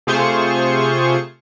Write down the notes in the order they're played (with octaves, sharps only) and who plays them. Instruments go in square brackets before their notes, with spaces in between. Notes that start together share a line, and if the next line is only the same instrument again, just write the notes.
[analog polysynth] C3 A3 F4 G#4 C5 C#6